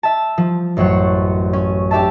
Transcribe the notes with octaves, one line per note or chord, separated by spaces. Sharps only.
E5 A5
F3
A1 F#2 C5 C#5 F#5
C#4
D4 G4 E5 A5